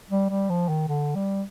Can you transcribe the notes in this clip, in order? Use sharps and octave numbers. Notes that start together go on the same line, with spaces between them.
G3
G3
F3
D#3
D3
G3